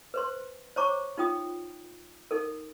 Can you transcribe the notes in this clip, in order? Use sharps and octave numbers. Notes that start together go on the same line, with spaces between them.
B4 C5 C6
C5 C#5 A5 A#5 C#6 D6
D#4 F4 G5 D#6
D#4 A4 A#4